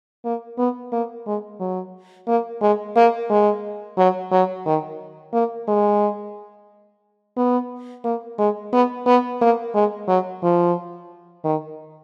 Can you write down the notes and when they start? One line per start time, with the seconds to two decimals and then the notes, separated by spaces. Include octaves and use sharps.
0.25 A#3
0.58 B3
0.92 A#3
1.27 G#3
1.60 F#3
2.28 A#3
2.62 G#3
2.96 A#3
3.30 G#3
3.98 F#3
4.32 F#3
4.66 D#3
5.33 A#3
5.68 G#3
7.37 B3
8.04 A#3
8.38 G#3
8.73 B3
9.07 B3
9.41 A#3
9.75 G#3
10.08 F#3
10.43 F3
11.45 D#3